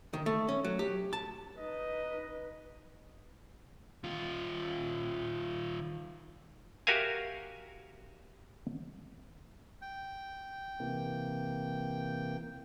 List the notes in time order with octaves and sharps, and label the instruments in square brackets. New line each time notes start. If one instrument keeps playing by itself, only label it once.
[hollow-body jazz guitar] D#3
A3
C#4
F#3
G4
A5
[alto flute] D#4 [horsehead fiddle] B4 [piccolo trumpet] D#5
[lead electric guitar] D#3 F4
[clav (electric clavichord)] F#4 G4 A#4 E5 F5 G#5
[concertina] G5
[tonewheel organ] C3 E3 A#3